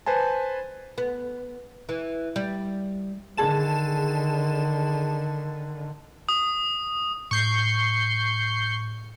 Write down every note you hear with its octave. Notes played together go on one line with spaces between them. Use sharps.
B4 C5 G#5 A5
B3
E3
G3
D3 D#3 G#4 A5 E7
D#6
A2 C#6 G6 C7